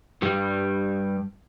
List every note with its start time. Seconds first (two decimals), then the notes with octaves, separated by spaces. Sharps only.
0.22 G2 G3